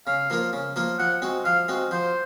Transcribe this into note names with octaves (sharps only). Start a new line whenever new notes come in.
C#3 F5
F3 A#3 F4 A#4
C#3
F3 A#3 F4 A#4
F3 F#5
G#3 C4 F#4
F3 F5
G#3 C4 F#4
F3 C5